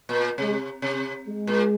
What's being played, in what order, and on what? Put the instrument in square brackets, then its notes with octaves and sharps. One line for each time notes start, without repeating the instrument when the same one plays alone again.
[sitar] A#2
[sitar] C3 [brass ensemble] G#3
[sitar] C3
[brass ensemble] G#3
[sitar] A#2